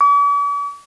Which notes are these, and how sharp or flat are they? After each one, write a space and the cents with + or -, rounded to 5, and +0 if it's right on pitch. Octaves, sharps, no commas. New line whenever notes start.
D6 -45